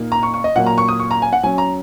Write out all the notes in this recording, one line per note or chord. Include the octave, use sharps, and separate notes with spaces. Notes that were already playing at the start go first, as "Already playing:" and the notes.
Already playing: A#2 A#3 D#4
A#5
C#6
C#6
D#5
A#2 F#3 A#3 F#5
A#5
C#6
D#6
C#6
A#5
G#5
F#5
F#3 C#4 G#5
A#5